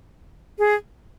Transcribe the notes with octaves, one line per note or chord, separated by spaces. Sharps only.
G#4